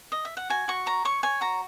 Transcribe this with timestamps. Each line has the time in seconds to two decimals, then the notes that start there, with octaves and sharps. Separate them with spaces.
0.12 D#5
0.25 E5
0.37 F#5
0.50 F#4 G#5
0.68 F#4 C#6
0.86 C#5 A#5
1.05 C#5 C#6
1.23 C#5 G#5
1.41 F#4 A#5